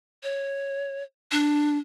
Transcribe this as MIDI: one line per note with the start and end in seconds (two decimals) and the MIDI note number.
0.23 1.03 73
1.32 1.78 62